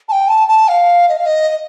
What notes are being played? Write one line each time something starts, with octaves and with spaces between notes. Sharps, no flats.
A5
G5
A5
A5
F5
D#5
F5
D#5
D#5